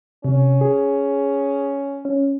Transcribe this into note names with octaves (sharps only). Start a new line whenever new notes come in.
C3 C#4
G#4
C#4